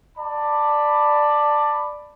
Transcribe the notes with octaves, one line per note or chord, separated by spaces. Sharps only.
D5 A5 B5